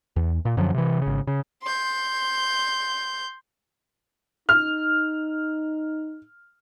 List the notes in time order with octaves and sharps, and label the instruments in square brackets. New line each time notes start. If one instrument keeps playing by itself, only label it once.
[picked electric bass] E2
A#2
F#2 D3 F3 F#3
C3 E3
G#1 C#3
C#3
[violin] C6 G6
[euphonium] D#4 [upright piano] F6